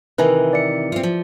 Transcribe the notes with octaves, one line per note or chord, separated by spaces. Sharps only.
C3 D#3 E3 B4 G#5
D5 E5 C#7
C4 F4
F3